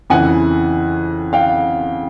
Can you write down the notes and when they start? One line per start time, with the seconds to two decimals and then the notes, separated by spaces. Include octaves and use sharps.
0.10 F2 C#3 E3 F#5 G#5
1.33 F5 G5